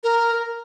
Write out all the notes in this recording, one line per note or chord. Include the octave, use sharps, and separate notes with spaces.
A#4